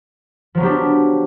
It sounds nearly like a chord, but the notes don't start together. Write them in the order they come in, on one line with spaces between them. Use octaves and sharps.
F3 F#3 B3 G4 D4